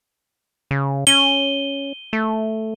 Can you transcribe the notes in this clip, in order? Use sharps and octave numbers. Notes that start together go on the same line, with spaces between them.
C#3
C#4 D#7 G7
A3